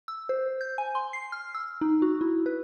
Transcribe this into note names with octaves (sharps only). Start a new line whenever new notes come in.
E6
C5
G6
G#5
C6
C7
F6
E6
D#4
F#4
E4
B4